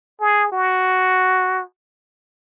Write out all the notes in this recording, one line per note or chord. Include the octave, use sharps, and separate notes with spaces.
G#4
F#4